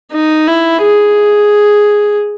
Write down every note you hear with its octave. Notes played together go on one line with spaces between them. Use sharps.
D#4
E4
G#4